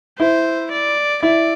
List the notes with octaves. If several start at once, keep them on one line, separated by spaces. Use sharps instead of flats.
E4 C5
D5
E4 D5